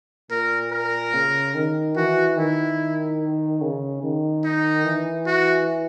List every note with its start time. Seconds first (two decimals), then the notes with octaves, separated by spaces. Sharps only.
0.31 A#2 A#4
0.71 A#4
1.14 C#3
1.55 D#3
1.96 E3 F#4
2.37 D#3 E4
3.61 C#3
4.03 D#3
4.45 D#4
4.85 E3
5.26 F#4